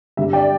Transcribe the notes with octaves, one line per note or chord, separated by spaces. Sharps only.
G2 D3 G3 E5
D5 G5